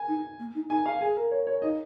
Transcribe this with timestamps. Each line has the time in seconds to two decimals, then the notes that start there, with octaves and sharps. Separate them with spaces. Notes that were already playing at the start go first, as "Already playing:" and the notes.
Already playing: G#5
0.08 D#4
0.39 A#3
0.55 D#4
0.69 D#4 G#5
0.86 F5
1.01 G#4 G#5
1.17 A#4
1.31 C#5
1.47 C#5
1.62 D#4 D#5